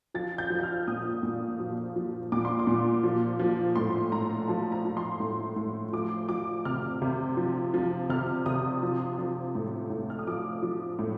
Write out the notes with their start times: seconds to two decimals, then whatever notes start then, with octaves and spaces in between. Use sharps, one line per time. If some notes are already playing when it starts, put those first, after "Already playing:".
0.14 F3 A6
0.38 G6
0.50 F3
0.59 G6
0.63 F6
0.88 A#2 D#6
1.23 A#2
1.60 F3
1.96 F3
2.32 A#2 D6
2.45 C6
2.59 D6
2.67 A#2
3.03 F3
3.39 F3
3.76 A2 C6
4.12 A2 A#5
4.48 F3 A5
4.72 A#5
4.85 F3
4.97 C6
5.20 A2
5.56 A2
5.93 F3 D6
6.29 F3 D6
6.65 C3 F6
7.02 C3
7.37 F3
7.74 F3
8.09 C3 F6
8.46 C3 D#6
8.83 F3
9.18 F3
9.55 A2
9.90 A2
10.10 F6
10.19 D#6
10.27 F3 D6
10.63 F3
10.99 A2